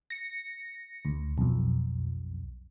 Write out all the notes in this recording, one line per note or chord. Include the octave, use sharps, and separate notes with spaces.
A#6 C#7
D2
B1 F2